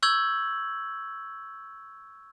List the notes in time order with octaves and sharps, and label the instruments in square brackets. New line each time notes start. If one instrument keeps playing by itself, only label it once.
[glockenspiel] C#6 E6 G6 G#6 F#7